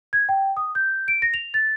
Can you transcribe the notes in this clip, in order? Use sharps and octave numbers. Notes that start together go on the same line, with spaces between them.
G#6
G5
D#6
G6
D7
A#6
F7
A6